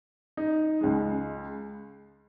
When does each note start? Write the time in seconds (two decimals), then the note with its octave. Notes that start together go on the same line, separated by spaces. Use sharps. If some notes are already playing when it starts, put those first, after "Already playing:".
0.37 D#4
0.81 C#2 C#3 G#3